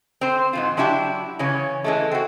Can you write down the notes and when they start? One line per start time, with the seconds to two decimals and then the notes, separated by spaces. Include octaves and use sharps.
0.21 C4 C5
0.53 G#2 E3 F4
0.77 F#3 D4 E4 F#4 G4
1.39 C#3 E3 C#4 C#5
1.84 E3 G#3 A3
2.12 C4 F#4